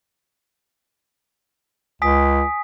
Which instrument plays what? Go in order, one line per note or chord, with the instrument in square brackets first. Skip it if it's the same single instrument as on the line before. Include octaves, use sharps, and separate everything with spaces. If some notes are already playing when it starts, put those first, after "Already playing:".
[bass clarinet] C#2 [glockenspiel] G#5 D#6 B6